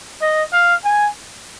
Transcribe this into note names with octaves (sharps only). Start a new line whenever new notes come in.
D#5
F5
G#5